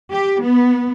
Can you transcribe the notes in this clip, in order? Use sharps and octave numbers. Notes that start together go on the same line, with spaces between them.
G4
B3